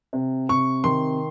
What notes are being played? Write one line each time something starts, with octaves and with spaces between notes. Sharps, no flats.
C3
C3 C#6
D#3 C6